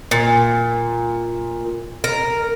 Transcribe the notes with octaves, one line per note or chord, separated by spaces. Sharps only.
A#2
A#4